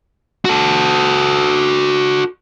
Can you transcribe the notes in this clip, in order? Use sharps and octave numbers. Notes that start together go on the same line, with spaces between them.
F#4 A4